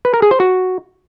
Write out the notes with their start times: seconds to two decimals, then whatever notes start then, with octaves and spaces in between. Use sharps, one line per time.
0.05 B4
0.14 A#4
0.22 G#4
0.31 C5
0.40 F#4